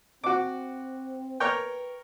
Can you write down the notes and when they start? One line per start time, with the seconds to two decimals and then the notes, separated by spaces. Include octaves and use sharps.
0.24 C4 F#4 D6
1.40 A#4 B4 C#5 G5